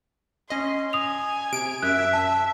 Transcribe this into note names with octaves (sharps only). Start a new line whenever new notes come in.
C#4 D#5 C6
G#5 D#6 F7
C3 D7
F#2 E5 F#6
A5